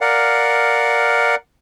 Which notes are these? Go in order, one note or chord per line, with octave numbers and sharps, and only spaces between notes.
A#4 D5 F5 F#5